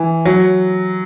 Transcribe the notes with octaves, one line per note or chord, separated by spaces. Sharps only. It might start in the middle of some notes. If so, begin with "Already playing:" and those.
Already playing: E3
F#3